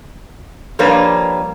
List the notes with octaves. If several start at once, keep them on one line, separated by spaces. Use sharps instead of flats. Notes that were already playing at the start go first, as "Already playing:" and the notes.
F3 G3 A#3 D4 B4 C#5